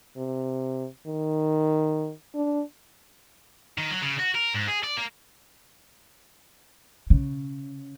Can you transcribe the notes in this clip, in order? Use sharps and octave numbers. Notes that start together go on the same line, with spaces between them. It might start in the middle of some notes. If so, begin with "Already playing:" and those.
C3
D#3
D4
D#3
F#3
C#3
F#4
A#4
G#2
G#4
D5
A#3
C#3